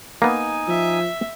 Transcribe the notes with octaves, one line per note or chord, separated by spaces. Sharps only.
A#3 B3 D#4 G#5
F3 E5